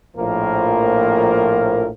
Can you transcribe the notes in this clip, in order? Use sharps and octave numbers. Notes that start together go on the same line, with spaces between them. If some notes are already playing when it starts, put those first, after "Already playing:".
A#1 A2 F3 A#3 A#4